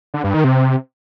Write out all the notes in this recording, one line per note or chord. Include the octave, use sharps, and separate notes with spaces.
D3
G2
D#3
C3